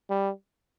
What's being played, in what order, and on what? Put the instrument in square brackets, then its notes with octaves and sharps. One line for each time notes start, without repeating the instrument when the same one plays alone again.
[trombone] G3